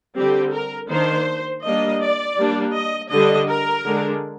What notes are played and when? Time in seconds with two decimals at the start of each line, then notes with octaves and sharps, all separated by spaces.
0.16 D3 G3 C4 G4
0.53 A#4
0.90 D#3 A#3 D4 C5
1.63 G3 A#3 D4 D#5
2.01 D5
2.38 G3 A#3 D4
2.75 D#5
3.11 D3 G3 D4 D#5
3.49 A#4
3.85 D3 G#3 D4